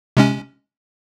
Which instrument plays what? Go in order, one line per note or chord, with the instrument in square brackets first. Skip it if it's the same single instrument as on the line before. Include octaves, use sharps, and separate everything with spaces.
[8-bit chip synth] C3 G#3 C#4